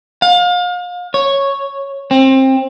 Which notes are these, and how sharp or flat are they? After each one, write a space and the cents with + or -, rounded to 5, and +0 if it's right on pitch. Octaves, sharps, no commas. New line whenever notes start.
F5 +35
C#5 -5
C4 +25